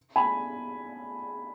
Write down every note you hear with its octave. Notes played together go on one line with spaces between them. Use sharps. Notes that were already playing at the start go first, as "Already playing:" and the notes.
G#5 B5